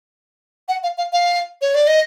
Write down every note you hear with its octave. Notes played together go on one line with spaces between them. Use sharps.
F#5
F5
F5
F5
C#5
D5
D#5